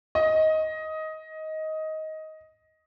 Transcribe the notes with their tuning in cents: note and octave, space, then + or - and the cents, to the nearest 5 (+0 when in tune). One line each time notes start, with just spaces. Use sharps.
D#5 +15